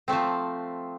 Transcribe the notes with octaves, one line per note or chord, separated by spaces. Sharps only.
F3 A3 C4